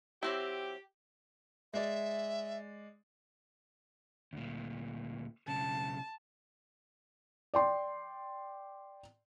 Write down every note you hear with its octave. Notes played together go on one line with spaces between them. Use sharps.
F#3 C4 E4 G4
G#3 D5 E5
D2 A#2
B1 C#3 A5
D5 G5 C6